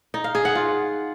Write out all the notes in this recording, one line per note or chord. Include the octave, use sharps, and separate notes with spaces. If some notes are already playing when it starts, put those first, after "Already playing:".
D#4
F5
G#4
F#5
F4